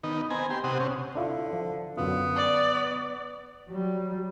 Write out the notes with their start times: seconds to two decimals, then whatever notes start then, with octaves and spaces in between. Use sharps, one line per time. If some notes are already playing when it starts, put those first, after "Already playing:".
0.03 D#3 B3 D#4
0.30 B3 C4 G#5 A#5
0.50 G4 C6
0.64 C3 C4 G4 F#5 D#6
0.80 C3 C#4
1.15 D3 D4 E4 F4
1.53 F3
1.98 F#2 D3 B3 F4
2.36 D5
3.69 F#3 G3